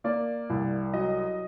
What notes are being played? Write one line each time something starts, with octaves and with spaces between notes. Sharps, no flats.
A#3 D5
C2
F#3 D#5